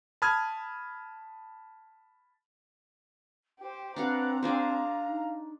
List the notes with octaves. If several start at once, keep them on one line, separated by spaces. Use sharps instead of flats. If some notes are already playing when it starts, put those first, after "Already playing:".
A5 B5 D#6 F6 G#6
G4 C5 G5
C4 D4 B4 F5 F#5 A#5
D4 G#4 C5 F5
D#4